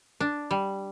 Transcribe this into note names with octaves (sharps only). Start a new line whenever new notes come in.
D4
G3